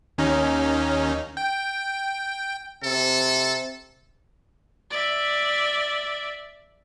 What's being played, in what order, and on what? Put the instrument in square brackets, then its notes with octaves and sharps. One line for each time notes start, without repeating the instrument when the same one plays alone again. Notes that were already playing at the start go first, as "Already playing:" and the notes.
[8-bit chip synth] D#2 C#4 D#4
G5
[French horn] C3 [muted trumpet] A4
[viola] D5 E5